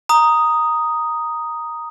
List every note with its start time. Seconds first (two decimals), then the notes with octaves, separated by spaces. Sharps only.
0.09 A#5 D#6